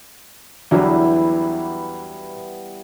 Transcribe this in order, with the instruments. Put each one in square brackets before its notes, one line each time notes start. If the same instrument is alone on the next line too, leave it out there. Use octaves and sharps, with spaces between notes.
[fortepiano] E2 D3 F#3 [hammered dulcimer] E3 G3 B3